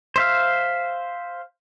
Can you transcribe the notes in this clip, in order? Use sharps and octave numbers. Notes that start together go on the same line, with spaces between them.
C5 E5 F5